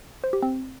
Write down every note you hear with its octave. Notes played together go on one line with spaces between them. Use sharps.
C5
G4
C4